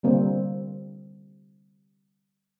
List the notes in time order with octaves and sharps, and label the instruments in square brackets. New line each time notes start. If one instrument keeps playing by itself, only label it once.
[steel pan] D3 G3 A#3 C4